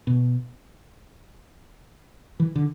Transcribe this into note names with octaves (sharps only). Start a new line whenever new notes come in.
B2
E3
D3